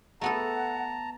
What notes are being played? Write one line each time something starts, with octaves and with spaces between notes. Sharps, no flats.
A3 B3 A4 F#5 A5 A#5